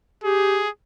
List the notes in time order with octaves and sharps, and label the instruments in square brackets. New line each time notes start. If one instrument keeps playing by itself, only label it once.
[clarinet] G4 [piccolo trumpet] G#4